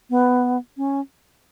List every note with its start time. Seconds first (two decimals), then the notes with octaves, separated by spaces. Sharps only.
0.10 B3
0.77 C#4